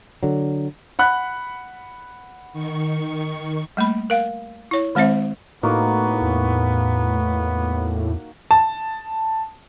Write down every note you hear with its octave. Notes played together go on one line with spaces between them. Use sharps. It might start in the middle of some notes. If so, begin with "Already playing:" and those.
D3 F#3
F#5 B5 F#6
D#3 C#6
G3 A3 A#3 B5
A#4 F5 F#5
E4 C#5
D#3 G#3 C4 C5 E5
A2 A#3 B3 D#4 F#4
E2
A5